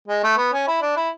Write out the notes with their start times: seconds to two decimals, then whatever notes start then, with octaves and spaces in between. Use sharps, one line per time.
0.08 G#3
0.23 A3
0.37 B3
0.53 C#4
0.68 E4
0.81 D4
0.96 E4